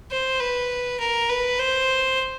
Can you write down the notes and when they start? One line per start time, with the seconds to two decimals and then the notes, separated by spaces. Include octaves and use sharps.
0.11 C5
0.40 B4
1.00 A#4
1.29 B4
1.59 C5